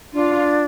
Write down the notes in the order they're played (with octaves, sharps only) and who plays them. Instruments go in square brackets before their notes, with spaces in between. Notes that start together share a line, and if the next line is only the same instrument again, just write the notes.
[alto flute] D4 [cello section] F4